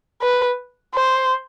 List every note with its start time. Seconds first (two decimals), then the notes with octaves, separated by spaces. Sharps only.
0.22 B4
0.94 C5